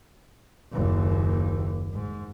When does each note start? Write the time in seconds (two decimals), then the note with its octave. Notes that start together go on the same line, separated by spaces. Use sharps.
0.73 F#1 D#2
1.93 G#2